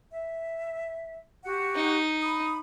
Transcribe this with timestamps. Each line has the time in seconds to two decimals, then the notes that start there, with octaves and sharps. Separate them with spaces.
0.11 E5
1.44 F#4 G4 F#5
1.75 D#4
2.22 B5 D#6